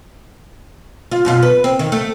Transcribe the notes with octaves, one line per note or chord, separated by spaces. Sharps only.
F4
F#2 B2 F4
B4
C4
D#3
A3